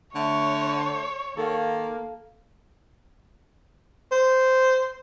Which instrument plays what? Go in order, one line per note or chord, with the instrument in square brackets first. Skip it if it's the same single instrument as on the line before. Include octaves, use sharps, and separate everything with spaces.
[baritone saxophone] D3 [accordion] A3 [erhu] C#5
[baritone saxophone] D#3 [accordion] A#3 [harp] A4 F5
[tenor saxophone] C5